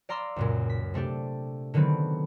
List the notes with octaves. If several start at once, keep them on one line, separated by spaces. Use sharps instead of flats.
D5 F5 A#5 C6 D6 E6
C#2 F#2 A#2
B6
C3 A3 D4 G4
D3 D#3 F#3 B3 C4